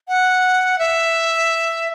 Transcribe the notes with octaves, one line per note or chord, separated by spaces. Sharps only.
F#5
E5